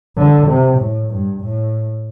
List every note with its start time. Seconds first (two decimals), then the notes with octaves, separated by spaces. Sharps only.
0.17 D3
0.47 C3
0.78 A2
1.10 G2
1.40 A2